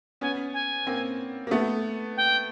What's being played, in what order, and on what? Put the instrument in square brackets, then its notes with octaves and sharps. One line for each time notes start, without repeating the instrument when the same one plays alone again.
[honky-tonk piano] B3 C#4 [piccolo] G#5
[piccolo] G#5
[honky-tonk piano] A#3 C4
A#3
A3 B3
[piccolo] G5